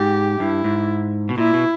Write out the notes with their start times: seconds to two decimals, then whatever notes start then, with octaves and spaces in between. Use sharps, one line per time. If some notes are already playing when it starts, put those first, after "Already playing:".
Already playing: G#2 G4
0.40 G2 E4
0.64 G#2
1.29 B2
1.37 A#2 E4
1.54 B2